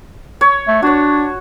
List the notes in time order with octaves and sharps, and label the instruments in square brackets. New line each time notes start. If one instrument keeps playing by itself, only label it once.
[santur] C#5
[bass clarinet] A3
[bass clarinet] D4 [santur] F#4 C#5